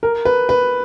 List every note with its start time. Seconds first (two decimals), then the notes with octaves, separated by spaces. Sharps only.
0.03 A#4
0.25 B4
0.49 B4